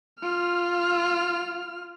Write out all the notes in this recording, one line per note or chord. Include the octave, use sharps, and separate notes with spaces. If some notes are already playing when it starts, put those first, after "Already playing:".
F4 F6